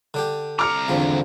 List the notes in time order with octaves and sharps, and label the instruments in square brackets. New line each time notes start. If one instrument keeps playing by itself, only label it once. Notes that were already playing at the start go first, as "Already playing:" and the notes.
[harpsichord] D3 D4 G4
[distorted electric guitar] C2 A#5 [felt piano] D6 F6 C#7
[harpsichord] E2 F3 [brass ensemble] D3 C4